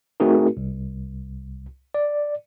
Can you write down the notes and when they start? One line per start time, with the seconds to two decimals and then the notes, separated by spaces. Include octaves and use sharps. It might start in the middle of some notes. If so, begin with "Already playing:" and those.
0.20 A3 C4 D#4 F#4 G#4 A#4
0.57 C2
1.94 D5